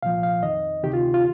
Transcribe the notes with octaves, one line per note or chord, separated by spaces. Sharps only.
C2 A#2 F3 F5
F5
F2 D#3 D#5
D2 C3 D#3 G4
F4
F4